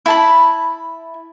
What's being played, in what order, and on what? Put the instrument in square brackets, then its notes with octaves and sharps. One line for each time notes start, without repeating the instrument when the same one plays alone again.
[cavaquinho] E4 A5 B5